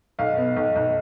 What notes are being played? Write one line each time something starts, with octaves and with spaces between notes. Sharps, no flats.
B1 F5
B3
B1
B1